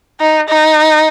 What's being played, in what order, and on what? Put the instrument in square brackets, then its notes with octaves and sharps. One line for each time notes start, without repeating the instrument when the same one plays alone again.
[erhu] D#4
D#4